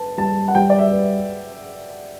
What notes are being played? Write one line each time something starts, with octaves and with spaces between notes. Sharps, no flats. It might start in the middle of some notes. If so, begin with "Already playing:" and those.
Already playing: B4 A5
G3 A5
F#5
G3 G5
D5
E5
B4